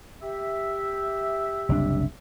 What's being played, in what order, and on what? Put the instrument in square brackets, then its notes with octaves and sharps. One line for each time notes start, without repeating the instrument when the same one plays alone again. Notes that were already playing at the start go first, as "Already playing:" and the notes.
[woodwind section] G4 E5
[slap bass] F#1 C2 D4